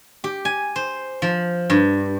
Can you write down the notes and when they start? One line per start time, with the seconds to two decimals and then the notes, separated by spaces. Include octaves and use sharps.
0.24 G4
0.45 G#5
0.76 C5
1.22 F3
1.70 G2